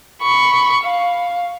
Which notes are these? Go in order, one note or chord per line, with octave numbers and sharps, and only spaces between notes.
B5 C#6
F5